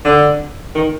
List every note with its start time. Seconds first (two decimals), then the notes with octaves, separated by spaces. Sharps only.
0.05 D3
0.75 D#3